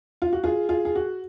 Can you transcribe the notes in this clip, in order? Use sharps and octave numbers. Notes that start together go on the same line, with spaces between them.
F4
F#4
F4 G#4
F4 G#4
G#4
F#4